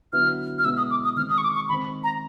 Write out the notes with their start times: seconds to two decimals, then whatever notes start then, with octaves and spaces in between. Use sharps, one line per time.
0.13 D3 F#3 B3 E4 F6
0.58 F6
0.64 B2 G#3 B3 E4 E6
0.77 D#6
0.91 D6
1.04 D#6
1.16 D#3 G#3 C4 F6
1.30 D#6
1.38 C#6
1.43 D6
1.55 C#6
1.69 D#3 G#3 C4 B5
2.03 A#5